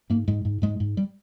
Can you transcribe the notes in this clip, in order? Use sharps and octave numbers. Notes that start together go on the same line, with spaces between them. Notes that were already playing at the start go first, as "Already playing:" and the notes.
G#2 A#3
G#2 G#3
G#2
G#2 G#3
G#2
G3